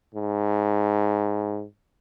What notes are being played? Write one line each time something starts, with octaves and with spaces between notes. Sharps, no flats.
G#2